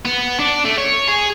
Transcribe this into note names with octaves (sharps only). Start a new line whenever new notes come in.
B3
D4
A3
C#5
G#4